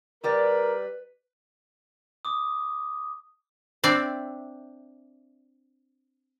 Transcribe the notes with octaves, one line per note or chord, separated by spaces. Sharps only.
G3 G4 A#4 B4 D5
D6 D#6
C4 D4 D5 E5